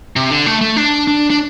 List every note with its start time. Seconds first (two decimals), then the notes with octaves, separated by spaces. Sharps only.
0.16 C3
0.31 D3
0.46 A3
0.61 A3
0.76 D4
1.07 D4
1.30 D4